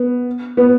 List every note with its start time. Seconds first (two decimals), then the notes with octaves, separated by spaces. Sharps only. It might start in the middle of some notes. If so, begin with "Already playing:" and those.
Already playing: B3
0.57 B3